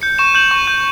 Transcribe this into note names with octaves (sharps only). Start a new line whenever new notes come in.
G6 C#7
C#6 E7
G6 F#7
C#6
G6